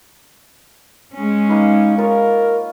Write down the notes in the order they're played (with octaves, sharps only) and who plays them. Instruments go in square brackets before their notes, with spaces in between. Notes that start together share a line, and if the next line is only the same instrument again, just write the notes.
[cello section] G#3 C#4
[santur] A#3 B4 [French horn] D#4
[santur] D#4 F4 C#5 [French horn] A#4